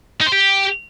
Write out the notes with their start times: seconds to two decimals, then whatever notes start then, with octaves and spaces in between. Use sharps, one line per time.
0.21 D#4
0.26 C5
0.32 G4